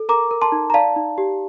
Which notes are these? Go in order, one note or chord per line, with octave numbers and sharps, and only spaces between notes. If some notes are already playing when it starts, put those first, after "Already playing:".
Already playing: A4
A#4 A#5 D6
A#4
A5 C6
D#4
A#5
D5 F5 A5
D#4
G4